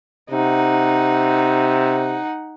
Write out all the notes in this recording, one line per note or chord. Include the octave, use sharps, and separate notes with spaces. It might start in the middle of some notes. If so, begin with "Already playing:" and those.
C3 D#4 F#5